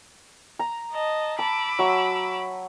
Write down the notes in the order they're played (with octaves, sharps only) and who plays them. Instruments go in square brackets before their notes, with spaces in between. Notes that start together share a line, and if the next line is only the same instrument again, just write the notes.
[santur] A#5
[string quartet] D#5 A5
[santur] A5 [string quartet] B5 D6 E6
[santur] F#3 E5